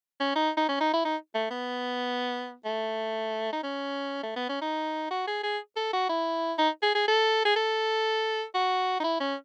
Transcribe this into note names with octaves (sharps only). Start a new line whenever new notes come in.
C#4
D#4
D#4
C#4
D#4
E4
D#4
A3
B3
A3
D#4
C#4
A3
B3
C#4
D#4
F#4
G#4
G#4
A4
F#4
E4
D#4
G#4
G#4
A4
G#4
A4
F#4
D#4
E4
C#4